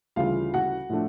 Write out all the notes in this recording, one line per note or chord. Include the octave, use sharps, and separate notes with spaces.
D2 C#3 E3 G3 F4 F5
F#4 F#5
A2 F3 A3 D4